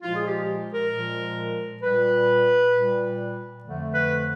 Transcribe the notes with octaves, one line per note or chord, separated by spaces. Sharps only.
A#2 F3 G#3 F4
G#4
G4
A#4
A#2 F3 G#3
A#2 G3 B4
A#2 G3
F2 D3 F3 A3
B4